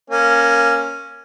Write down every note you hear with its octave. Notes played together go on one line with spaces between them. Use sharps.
A#3 C#4